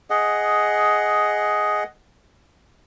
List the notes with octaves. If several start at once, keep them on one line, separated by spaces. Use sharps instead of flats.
G#4 D#5 F#5